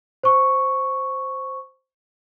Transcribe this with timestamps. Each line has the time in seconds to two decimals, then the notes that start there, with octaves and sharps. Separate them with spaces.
0.23 C5 C#6